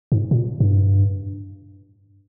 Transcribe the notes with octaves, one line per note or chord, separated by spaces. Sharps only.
G#2
A#2
G2